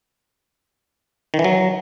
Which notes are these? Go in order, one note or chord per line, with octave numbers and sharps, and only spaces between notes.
D#3
E3
F#3